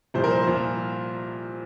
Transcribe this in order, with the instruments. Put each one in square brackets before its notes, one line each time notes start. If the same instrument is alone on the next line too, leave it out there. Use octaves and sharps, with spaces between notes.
[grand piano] C2 A#2 F3 C5
A#4
C5
C2 A#2 F3